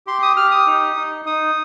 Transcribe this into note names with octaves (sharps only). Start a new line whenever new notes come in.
G4 C6
D#6
G4 F6
D#6
D#4
D#4
D#4 D#6